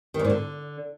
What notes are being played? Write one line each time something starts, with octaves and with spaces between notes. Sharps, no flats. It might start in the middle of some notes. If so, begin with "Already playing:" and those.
D#3
G#2
A#2
D3